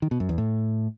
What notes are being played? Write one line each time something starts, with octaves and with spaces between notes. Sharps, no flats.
D#3
B2
F#2
E2
A2